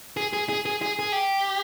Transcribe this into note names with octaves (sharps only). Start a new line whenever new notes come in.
G#4
G#4
G#4
G#4
G#4
G#4
G4